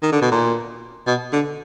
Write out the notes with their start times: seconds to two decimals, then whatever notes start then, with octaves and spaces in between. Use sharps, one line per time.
0.03 D#3
0.12 D3
0.22 B2
0.32 A#2
1.07 B2
1.33 D3